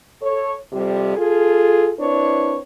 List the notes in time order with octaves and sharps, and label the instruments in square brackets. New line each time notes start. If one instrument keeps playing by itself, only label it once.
[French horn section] A4 C#5
F2 C3 G3
F4 G#4 A4
C4 D4 E4 B4 C#5